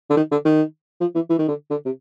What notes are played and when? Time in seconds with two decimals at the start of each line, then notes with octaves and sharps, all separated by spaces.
0.10 D3
0.17 D#3
0.31 D3
0.45 D#3
1.00 F3
1.15 E3
1.29 E3
1.39 D#3
1.48 D3
1.71 D3
1.85 C3